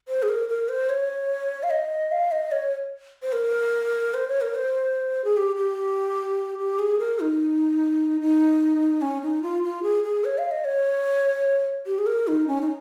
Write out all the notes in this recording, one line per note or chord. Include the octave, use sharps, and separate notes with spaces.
C5
G#4
A#4
A#4
C5
C#5
F5
D#5
F5
D#5
C#5
C5
A#4
C5
C#5
A#4
C5
G#4
G4
G4
G4
G#4
A#4
D#4
D#4
C#4
D#4
F4
F4
G#4
G#4
C#5
F5
D#5
C#5
G4
G#4
A#4
D#4
C#4
D#4